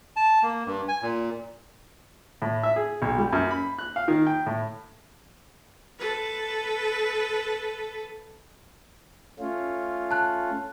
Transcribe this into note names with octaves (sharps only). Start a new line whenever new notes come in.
A5
A#3
G2
G#5
A#2
A2
E5
G#4
B1
G3
F#2
B5
F#6
F5
D#3
G5
A2
A4 B4
A3 C#4 F4
A5 F#6